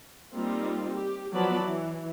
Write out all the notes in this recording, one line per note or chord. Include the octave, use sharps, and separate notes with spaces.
G3 A#3 C4 D#4 F4
G4
F3 F#3 B3 D5 A5 B5
E3